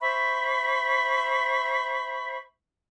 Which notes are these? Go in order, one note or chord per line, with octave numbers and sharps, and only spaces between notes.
C5 E5 B5 C#6